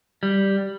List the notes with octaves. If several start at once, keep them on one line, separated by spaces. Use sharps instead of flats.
G3